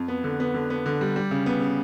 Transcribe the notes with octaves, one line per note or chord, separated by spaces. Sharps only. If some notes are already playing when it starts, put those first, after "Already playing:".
Already playing: F2
B3
D3
B3
D3
B3
D3
G3
G3
C#3
B3
C#3